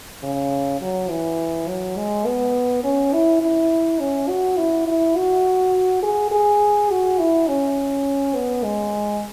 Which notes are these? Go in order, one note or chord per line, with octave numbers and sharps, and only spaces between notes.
C#3
F#3
E3
F#3
G#3
B3
C#4
E4
E4
C#4
F#4
E4
E4
F#4
G#4
G#4
F#4
E4
C#4
B3
G#3